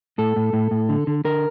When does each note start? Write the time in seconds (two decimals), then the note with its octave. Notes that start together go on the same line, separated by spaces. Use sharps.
0.18 A2 A4
0.36 A2
0.53 A2
0.71 A2
0.89 D3
1.07 D3
1.25 D3 A#4